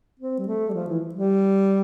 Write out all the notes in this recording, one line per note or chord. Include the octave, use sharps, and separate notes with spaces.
C4
G3
A3
G3
F3
E3
G3